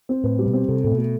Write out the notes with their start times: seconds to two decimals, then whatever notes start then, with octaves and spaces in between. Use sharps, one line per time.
0.09 C4
0.24 A2 B4
0.39 G3
0.46 B2
0.53 C4
0.68 C3 A4
0.84 A2 A3
0.92 B2
0.98 A3